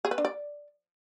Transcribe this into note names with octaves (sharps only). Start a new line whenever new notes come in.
G#4
B4
D4
D5